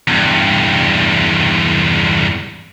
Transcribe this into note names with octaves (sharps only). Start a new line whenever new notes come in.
E2 G2